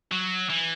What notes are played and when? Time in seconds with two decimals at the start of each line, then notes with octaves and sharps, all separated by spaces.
0.12 F#3
0.50 E3